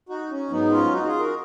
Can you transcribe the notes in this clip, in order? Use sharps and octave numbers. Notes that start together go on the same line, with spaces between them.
D#4 F#4
C#4
G#2 F#3 B3 D#4
C#4 F4
D#4 F#4
F#4
F4 G#4
F#4 A#4